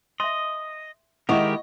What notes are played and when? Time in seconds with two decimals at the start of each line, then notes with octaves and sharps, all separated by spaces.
0.20 D#5 E5 C6
1.29 D#3 G#3 E4 G4 A#4 D#5 F#5 C#6